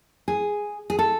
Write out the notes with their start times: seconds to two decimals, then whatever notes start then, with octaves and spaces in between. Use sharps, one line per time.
0.28 G#4
0.90 G#4
0.99 A4